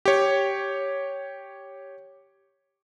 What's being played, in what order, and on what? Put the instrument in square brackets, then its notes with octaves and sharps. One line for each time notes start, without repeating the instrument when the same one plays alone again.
[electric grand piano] G4 C#5